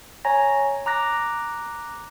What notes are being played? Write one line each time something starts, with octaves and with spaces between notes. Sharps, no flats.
C#5 G#5 A#5 A#6
A#5 D6 F#6 A#6